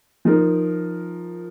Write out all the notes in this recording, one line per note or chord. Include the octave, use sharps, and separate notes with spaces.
F3 D#4 A#4